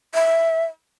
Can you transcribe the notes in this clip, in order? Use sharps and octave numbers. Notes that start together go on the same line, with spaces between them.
E5